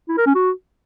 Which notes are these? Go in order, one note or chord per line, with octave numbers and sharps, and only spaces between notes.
E4
A#4
C#4
F#4